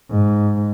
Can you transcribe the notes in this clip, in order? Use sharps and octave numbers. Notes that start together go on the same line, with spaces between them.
G#2